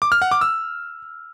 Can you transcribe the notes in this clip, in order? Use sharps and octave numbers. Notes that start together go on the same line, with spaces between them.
D6
F6
F#5
D6
E6